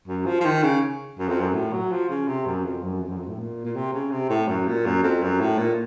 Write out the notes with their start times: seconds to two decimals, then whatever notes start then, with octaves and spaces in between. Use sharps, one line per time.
0.08 F#2
0.26 F3
0.41 F3
0.45 D#3
0.63 C#3
1.18 F#2
1.28 F2
1.40 F#2
1.54 A2
1.73 F#3
1.91 F3
2.09 C#3
2.27 C3
2.46 F#2
2.64 F2
2.83 F#2
3.01 F2
3.09 F#2
3.17 F2
3.28 A2
3.38 A#2
3.64 A#2
3.75 C3
3.93 C#3
4.11 C3
4.29 A2
4.48 F#2
4.67 A#2
4.86 F#2
5.03 F2
5.22 F#2
5.40 A2
5.58 A#2